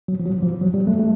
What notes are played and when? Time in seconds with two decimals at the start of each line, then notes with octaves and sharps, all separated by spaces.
0.08 F#3
0.20 F3
0.25 F#3
0.42 F3
0.61 F#3
0.74 G3
0.87 A3
1.00 A3